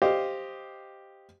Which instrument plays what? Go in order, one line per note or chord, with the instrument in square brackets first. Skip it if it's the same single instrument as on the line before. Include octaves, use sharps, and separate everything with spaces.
[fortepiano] G4 C5 D#5 F5